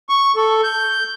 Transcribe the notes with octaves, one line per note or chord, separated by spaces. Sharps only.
C#6
A4
G6